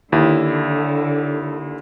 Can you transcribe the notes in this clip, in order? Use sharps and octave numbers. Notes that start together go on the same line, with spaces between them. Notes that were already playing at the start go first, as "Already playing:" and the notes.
D#2 D3 E4